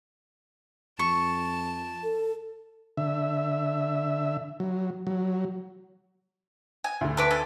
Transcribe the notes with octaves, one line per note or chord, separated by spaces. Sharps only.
F2 A5 C#6
A4
D3 E5
F#3
F#3
G#5
D2 D3
D4 B4 D6
A4 G#5